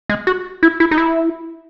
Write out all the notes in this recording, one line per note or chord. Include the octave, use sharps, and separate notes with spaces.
G#3
F#4
E4
E4
D#4
E4